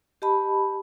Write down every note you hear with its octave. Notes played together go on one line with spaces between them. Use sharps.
G4 D#5 A5 B5